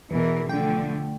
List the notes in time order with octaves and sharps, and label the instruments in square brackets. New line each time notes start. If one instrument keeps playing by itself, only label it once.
[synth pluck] E2 B2 [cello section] E3 A#4
[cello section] D3 F3 A3 [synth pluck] G5